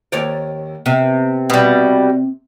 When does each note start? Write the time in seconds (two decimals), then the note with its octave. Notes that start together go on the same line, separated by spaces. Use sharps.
0.12 D#2 C#5 D5
0.86 C3 B3
1.50 B2 G3